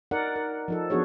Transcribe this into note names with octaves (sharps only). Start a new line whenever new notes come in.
D#4 A#4 D5 F#5
A#4
F3 D#4 A4
F3 B3 D4 F#4 G#4 C#5